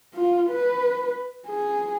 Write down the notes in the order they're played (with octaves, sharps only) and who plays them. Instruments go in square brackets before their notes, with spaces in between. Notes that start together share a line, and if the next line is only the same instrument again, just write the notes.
[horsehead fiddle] F4
B4
G#4